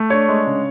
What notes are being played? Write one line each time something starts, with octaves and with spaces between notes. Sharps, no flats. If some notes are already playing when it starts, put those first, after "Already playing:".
Already playing: A3
D4 C#5
G#3
C#3